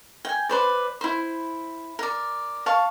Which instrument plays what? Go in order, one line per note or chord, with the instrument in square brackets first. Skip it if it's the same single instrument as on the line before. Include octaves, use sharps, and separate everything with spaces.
[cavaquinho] G5 G#5
B4 C5 D5
E4 C5
A#4 D5
F5 A5 C#6